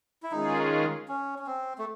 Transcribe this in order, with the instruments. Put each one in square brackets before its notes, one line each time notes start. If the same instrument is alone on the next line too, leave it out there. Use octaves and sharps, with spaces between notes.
[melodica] E4
[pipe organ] D#3 G#3 C#4 F4 G#4 [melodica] D#4
[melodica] C#4
C#4
C4
A3